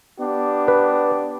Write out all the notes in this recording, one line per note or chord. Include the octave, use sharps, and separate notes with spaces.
B3 D4 G4
B4